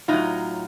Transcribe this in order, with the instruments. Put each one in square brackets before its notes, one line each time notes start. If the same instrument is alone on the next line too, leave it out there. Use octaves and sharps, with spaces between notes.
[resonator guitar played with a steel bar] A2 F#3 D#4 F4